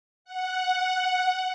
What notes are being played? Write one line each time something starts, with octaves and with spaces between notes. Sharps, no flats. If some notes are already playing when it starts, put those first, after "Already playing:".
F#5